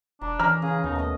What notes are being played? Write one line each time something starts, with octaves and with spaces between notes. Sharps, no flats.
E1 D4 A#5
E3 C#4 A#5 F6
C#3 G#4
D#2 B2 D#4
A3 C#4 D#5